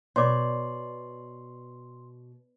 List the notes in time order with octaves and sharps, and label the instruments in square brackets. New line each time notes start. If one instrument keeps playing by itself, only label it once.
[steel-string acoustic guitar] B2 [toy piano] C#5 D5 D6 [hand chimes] C6